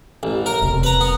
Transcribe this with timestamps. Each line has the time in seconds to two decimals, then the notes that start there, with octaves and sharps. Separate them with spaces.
0.23 A1
0.46 A#4
0.62 E1 C3
0.83 B4 A#5
1.01 B3